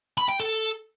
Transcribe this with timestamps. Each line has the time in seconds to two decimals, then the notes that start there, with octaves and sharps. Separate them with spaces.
0.18 B5
0.29 G5
0.40 A4